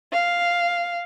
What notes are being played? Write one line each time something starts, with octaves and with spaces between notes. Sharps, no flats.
F5